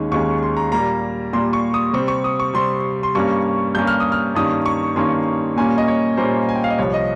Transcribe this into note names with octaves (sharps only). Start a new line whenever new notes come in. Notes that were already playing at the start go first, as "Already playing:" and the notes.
Already playing: D#2 D#3 G#3 C#4
D#2 D#3 G#3 C#4 C#6
C6
A#5
A#2 G3 A#3 A#5
A#2 G3 A#3 C6
C#6
D#6
C3 G3 C4 C#6
C#6
D#6
C#6
C3 G3 C4 C6
C6
G2 G3 A#3 C#4 C#6
G2 G3 A#3 C#4 G6
F6
D#6
F6
G2 D#3 A#3 C#4 D#6
C#6
G2 D#3 A#3 C#4 C6
A#2 G3 A#3 C#4 G#5
D#5
C#5
A#2 G3 A#3 C#4 C5
G#5
G5
F5
D#5
C2 C3 F3 C#5
D#5